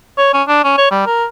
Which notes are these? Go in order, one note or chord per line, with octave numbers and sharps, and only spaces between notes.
C#5
C#4
D4
C#4
C#5
G3
A#4